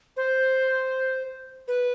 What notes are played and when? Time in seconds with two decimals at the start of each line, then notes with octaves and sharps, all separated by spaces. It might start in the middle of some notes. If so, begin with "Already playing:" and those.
0.17 C5
1.68 B4